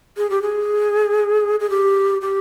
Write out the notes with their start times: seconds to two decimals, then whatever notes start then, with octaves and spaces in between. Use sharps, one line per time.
0.17 G#4
0.30 G4
0.42 G#4
1.60 G#4
1.70 G4
2.21 G4